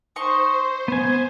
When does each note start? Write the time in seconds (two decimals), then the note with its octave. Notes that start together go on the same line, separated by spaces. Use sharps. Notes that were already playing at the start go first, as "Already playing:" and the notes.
0.16 D#4 C5 C6 C#6
0.88 B3 G#5